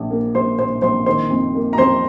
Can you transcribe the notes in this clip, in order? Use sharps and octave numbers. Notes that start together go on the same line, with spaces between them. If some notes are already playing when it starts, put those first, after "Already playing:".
Already playing: A#1 A#2
A#3
A#1 C5 C6
A#2 C5 C6
A#1 C5 C6
D#3 C5 C6
F2
A#3
A#5
F2 C5 C6